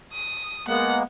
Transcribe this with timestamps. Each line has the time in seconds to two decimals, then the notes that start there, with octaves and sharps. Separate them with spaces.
0.13 D#6
0.68 G#3 A#3 B3 F#5